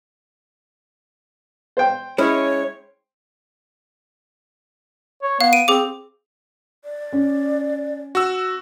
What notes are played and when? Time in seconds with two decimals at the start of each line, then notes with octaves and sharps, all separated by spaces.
1.77 C5 G5
2.18 G#3 C#4 E4 C#5
5.23 C#5
5.41 B3 F5
5.53 D7 D#7
5.68 C4 G#4 D6
6.84 D5
7.13 C#4
8.15 F#4 E6